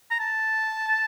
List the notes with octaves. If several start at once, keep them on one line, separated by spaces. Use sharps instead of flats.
A#5
A5